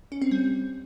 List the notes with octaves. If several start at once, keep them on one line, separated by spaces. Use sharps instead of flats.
C#4
C4
G3